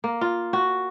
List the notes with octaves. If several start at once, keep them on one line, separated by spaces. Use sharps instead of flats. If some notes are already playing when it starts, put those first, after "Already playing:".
A#3
F4
F#4